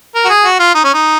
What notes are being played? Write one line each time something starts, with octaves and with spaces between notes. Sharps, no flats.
A#4
F#4
G#4
F#4
F4
D#4
C#4
D#4